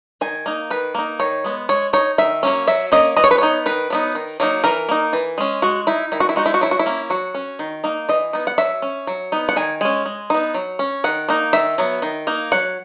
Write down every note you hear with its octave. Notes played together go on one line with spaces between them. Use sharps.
D#3 G#5
A#3 D#4
D#3 B4
A#3 D#4
D#3 C#5
G#3 B3
G#3 C#5
D#4 C#5
D#3 E5
F#3 A#3 C#4
F#3 E5
A#3 C#4 D#5
E3 D#5
C#5
B4
B3 D#4 C#5
D#3 B4
F#3 B3 D#4
D#3
F#3 A#3 D#4
E3 A#4
A#3 D#4
E3
G#3 C#4
G#3 F#4
D#4 E4
D#3 E4
F#4
E4
G#3 D#4 F#4
E4
F#4
F#3 E4
F#4
E4
A#3 C#4
F#3 F#4
C#4
D#3
A#3 D#4
E3 D#5
B3 D#4
F#5
F#3 E5
C#4
F#3
B3 D#4
F#5
D#3 G#5
G#3 C#4 G#5
G#3
B3 D#4
F#3
C#4
D#3 F#5
A#3 D#4
D#3 E5
F#3 B3
D#3
A#3 D#4
F#3 F#5